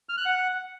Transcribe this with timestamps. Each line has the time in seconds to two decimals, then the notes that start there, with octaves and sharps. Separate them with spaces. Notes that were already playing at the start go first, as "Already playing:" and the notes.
0.09 F6
0.17 F#6
0.26 F#5